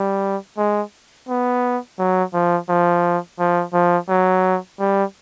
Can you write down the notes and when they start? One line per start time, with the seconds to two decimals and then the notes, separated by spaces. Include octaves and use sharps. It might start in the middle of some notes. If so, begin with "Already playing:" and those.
Already playing: G3
0.58 G#3
1.29 B3
1.99 F#3
2.33 F3
2.69 F3
3.39 F3
3.73 F3
4.09 F#3
4.80 G3